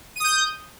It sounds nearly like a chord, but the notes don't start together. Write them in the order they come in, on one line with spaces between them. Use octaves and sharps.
D#7 D#6 G6